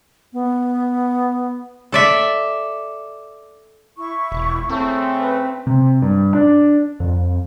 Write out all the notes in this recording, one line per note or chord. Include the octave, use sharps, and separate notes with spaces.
B3
A4 D5 E5
E4 C#6
E1
C#3 A3 C4
B4
C3
G2
D4
F2